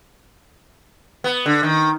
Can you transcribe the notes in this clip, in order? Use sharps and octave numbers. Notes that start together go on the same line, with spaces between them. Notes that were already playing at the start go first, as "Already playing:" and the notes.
B3
D3
D#3